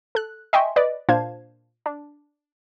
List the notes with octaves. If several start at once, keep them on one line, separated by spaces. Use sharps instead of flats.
A4 F#6
D#5 E5 G5 G#5 C6 C#6
B4 D5 D#5
A#2 D4 C5 F5 A5 G#6
D4